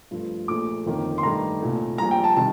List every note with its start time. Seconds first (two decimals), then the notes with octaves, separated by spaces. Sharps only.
0.11 G2 F3 A3
0.48 A#1 A#2 A3 D6
0.86 G1 F2 D#3 A#3
1.18 C6
1.23 G2 D#3 A3 A#5
1.61 C2 A#2 A3
1.98 A#1 A#2 G3 A#5
2.11 G5
2.24 A5
2.36 C3 D#3 G3 A5